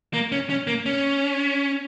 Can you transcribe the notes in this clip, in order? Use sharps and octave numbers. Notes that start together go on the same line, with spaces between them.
A#3
C#4
C#4
A#3
C#4